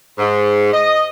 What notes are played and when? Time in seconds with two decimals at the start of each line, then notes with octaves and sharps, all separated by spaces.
0.19 G#2
0.73 D#5